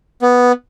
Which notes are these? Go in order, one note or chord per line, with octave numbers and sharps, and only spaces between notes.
B3